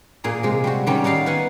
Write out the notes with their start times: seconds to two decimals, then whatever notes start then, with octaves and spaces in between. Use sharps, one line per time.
0.24 A#2 G#4 A#5
0.43 C3 G#3
0.64 G3 C4 F#4
0.87 D#3 G3 C#4
1.04 D#4 F#4 D5 F5 B5
1.26 B3 B4 F5 F#5 G#5